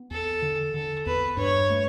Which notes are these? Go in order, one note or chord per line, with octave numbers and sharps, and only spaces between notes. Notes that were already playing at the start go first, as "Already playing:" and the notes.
Already playing: B3
E2 A4
D3
D3 A4
E2 B4
G2 C#5
A3